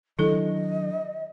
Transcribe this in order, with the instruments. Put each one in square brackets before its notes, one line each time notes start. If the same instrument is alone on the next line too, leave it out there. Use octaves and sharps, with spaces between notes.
[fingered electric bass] D#3 F#3 D4 [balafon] E4 A4 [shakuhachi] D#5